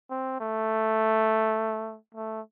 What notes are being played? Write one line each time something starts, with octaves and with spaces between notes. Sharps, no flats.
C4
A3
A3